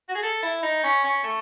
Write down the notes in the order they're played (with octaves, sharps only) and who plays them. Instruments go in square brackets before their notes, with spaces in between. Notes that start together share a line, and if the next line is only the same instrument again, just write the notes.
[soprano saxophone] F#4
G#4
A4
E4
D#4
C#4
C#4
A3